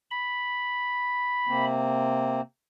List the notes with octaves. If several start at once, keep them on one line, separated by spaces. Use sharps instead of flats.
B5
C3 A#3 C4